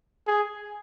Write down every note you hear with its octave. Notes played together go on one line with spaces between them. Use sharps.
G#4